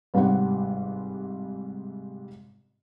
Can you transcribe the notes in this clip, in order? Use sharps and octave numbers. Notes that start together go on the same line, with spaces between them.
G1 G#2 C3 G3 F#5